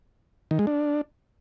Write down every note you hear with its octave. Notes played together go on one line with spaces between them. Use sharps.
D#3
G#3
D4